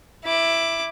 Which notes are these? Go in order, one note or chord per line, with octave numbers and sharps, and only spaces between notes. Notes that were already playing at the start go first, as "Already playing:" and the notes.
E4 D6